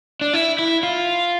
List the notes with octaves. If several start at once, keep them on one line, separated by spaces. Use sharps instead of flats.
D4
E4
E4
F4